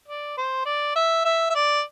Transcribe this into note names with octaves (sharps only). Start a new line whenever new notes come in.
D5
C5
D5
E5
E5
E5
D5